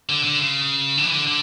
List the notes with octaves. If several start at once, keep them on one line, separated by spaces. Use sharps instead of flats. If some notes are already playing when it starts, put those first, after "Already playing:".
D3
D3
C#3
D3
E3
D3
D3